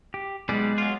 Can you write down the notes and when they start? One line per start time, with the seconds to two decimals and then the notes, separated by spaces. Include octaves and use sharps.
0.14 G4
0.49 B1 G3 G#3 B3 G#4 D5
0.78 F#3 F4